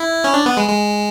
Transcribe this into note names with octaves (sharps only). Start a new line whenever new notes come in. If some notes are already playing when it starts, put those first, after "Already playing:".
Already playing: E4
C#4
D4
B3
G#3
G#3